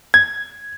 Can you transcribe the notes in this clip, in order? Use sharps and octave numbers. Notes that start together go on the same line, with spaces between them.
G#6